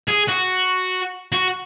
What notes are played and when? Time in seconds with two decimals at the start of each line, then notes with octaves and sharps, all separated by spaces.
0.09 G#4
0.28 F#4
1.32 F#4